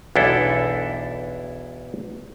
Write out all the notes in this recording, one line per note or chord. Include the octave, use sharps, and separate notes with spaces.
B1 E2 D4 E4 A4